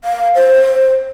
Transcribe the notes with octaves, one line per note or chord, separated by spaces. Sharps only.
F5
C5